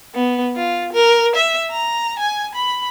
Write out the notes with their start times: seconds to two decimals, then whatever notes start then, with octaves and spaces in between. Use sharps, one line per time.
0.15 B3
0.56 F4
0.93 A#4
1.36 E5
1.71 A#5
2.19 G#5
2.55 B5